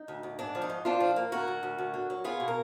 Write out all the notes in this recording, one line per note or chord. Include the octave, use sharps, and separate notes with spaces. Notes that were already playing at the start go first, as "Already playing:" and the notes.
Already playing: D#4
D2
D2
G#2 D4
F3
D#4
G#2
F3 D4 F4
F3
A#3
D2 F#4 A#4
D2
D2
D2
D3
F#3
B3 F4 G#4
B2
A#4